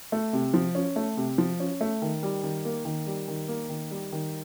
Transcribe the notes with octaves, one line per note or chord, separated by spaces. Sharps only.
A3
C3
F3
C#4
A3
C3
F3
C#4
A3
D#3
G3
D#3
A#3
D#3
G3
D#3
A#3
D#3
G3
D#3